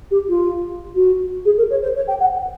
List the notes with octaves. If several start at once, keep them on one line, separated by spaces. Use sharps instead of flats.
G4
F4
F#4
G#4
A#4
C#5
C5
C#5
G5
F#5